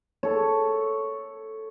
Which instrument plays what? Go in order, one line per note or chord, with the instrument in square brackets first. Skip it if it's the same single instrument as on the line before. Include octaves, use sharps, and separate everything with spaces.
[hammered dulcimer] A4 C#5